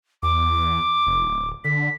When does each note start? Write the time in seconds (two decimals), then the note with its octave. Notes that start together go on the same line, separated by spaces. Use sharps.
0.23 E2 D6
1.06 F1
1.25 D1
1.64 D3 B6